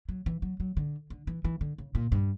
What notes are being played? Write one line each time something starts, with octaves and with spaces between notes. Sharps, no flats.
F#3
E3
F#3
F#3
D3
D3
E3
E3
D3
C#3
A#2
G2